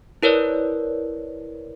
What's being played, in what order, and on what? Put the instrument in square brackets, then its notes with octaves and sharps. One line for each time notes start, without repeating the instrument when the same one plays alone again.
[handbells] E4 A#4 B4 C#5 D5